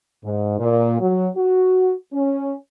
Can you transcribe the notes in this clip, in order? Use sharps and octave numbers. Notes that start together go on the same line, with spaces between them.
G#2
A#2
F#3
F#4
C#4